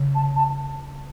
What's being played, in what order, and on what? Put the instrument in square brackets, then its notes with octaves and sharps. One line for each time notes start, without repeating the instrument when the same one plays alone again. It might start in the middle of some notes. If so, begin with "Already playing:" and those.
Already playing: [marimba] C#3
[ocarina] A5
A5